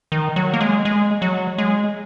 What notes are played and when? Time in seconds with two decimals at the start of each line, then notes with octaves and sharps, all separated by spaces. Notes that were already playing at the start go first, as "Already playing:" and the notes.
0.12 D#3
0.36 F#3
0.53 A#3
0.61 G#3
0.85 G#3
1.22 F#3
1.58 G#3